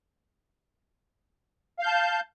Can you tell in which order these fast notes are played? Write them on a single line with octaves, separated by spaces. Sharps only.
F5 G6 A5